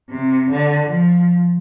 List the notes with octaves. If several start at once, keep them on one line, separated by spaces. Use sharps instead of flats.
C3
D3
F3